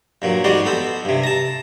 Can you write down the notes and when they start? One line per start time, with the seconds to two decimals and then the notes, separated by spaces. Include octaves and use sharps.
0.22 G2 A#2 F#3
0.44 A1 G#2 G3 F#4 D5 C6
0.65 B3 A4 C5
1.05 G2 C3
1.23 A5 A#5